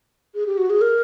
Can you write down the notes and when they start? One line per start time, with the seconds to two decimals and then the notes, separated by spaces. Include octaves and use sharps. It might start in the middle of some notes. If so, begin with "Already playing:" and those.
0.35 G#4
0.47 G4
0.58 F#4
0.70 G#4
0.81 A#4